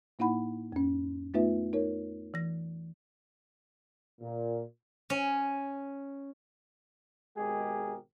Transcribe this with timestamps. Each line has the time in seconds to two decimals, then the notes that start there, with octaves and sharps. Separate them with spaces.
0.19 A2 A#3 D#4 E4 F#5 B5
0.72 F2 C#4
1.34 A3 B3 D#4 F4 B4 E5
1.73 D#4 A#4 C#5
2.34 E3 A#6
4.21 A#2
5.10 C#4
7.37 G#1 B2 G#3 G4 G#4 A#4